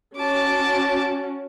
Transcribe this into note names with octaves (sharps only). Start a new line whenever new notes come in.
C#4 F#4 A5 D6